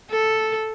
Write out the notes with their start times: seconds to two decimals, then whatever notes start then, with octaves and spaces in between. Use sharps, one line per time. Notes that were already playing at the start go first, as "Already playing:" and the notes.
0.11 A4